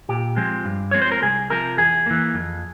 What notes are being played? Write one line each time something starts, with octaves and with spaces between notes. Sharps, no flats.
A#2 G4
F3 G#3 C4
G2
F3 G#3 C4 C#5
C5
A#4
C2 G#4
C3 F3 A#4
E2 G#4
E3 A#3
F2